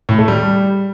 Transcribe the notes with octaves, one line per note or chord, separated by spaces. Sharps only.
A2
A3
G3